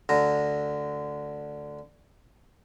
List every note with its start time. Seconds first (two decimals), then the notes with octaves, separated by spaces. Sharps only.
0.09 D2 D3 A#5